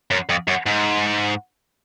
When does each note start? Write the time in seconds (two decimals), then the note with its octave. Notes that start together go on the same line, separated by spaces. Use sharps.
0.11 F#2
0.29 F2
0.48 F#2
0.66 G#2